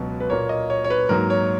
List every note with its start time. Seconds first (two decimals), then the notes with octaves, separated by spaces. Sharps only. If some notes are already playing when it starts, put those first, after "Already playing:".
Already playing: C#2 B2 F#3
0.20 B4
0.30 A#2 A#3 C#5
0.49 D#5
0.70 C#5
0.84 C#5
0.90 B4
1.09 G#2 F#3 A#3 A#4
1.30 C#5